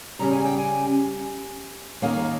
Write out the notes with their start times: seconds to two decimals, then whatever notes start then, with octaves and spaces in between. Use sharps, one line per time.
0.19 C#3 G3 C#4 A#5
0.33 G#5
0.45 G5
0.58 G#5
2.02 D#2 D#3 A#3 C#4 F5